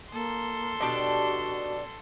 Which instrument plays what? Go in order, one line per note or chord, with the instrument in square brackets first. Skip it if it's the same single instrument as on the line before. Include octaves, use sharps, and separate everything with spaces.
[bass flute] A#3 [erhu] A4 [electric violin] C6
[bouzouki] B2 D4 G4 [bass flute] F#4